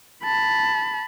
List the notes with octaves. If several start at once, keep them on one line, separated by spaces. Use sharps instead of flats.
A5 B5